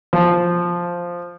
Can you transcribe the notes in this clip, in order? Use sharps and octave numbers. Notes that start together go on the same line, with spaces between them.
F3